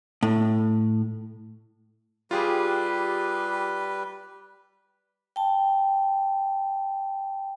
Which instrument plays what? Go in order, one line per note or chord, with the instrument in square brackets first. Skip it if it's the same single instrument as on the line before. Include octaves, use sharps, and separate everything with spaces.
[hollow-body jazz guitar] A2
[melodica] G3 B4 [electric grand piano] F4 G4 G#4
[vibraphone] G5 A5